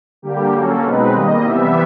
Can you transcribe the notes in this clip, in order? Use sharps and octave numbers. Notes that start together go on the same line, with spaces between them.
D3 G3 A#3 G4
F#3 A#3 C#4 A4
B2 G#3 C4 D#4 B4
D#3 G3 A#3 D#5
C3 E3 G3 B3 E5